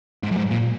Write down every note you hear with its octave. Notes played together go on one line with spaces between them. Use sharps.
G#2
F#2
G#2
A#2